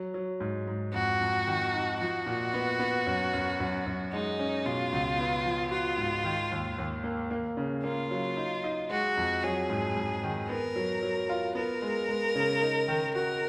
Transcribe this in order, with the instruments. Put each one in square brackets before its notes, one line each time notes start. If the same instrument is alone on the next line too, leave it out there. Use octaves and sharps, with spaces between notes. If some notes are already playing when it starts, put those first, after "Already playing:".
Already playing: [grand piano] F#3
F#3
G#2
G#2
[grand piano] F2 [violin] F#4
[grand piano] F2
D#3
D#4
[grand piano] F3 [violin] F#4
[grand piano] A#2
B3
B3
F#2
F#2
F#2
F#2
[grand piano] G#3 [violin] D#4
[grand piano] C#4
[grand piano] B2 [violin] F4
[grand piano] C#2
B3
F3
[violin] F4 [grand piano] F#4
[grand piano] G#2
D#3
D#2
D#2
A#3
A#3
C#3
[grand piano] A#3 [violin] F4
[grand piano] F#3
D#4
D#4
[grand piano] G#3 [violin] F#4
[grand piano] F2
[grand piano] F#3 [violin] G#4
[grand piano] G#2
G#2
D#3
[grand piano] B3 [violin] A#4
[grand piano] F#3
F#3
F4
[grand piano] B3 [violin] A#4
[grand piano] G#3
G#3
C#3
D#4
D#3
[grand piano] F#4 [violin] A#4